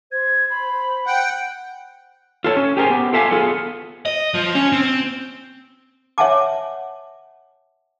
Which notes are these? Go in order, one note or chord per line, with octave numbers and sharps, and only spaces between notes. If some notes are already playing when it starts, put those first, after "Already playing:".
C5 G#6
B5
F#5 G5
F4 A4 C5 C#5
C#4
G4 G#4 A#4 C5 G#5
B3 G4
F4 A4 E5 F5 G#5
B3 F4 G#4 A4
D#5
F3
C#4
C4
C#5 E5 F#5 G#5 A5 D6